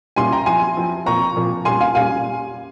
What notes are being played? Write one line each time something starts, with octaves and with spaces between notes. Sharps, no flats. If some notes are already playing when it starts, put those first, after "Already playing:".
A#2 G3 C#4 E4 G#5 C6
G5 A#5
F3 C4 E4 G#5 C6
F3 C4 E4
A#2 F3 C4 A#5 C#6
A#2 F3 C4
A#2 G3 C#4 G#5 C6
F5 G#5
A#2 G3 C#4 F5 G#5